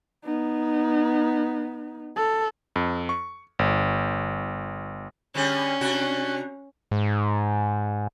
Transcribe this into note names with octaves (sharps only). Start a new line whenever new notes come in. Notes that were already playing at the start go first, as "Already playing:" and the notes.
B3 D#4
A4
F2
C#6
G1
D3 G3 C#4 G#4
C3 D4 F#4
G#2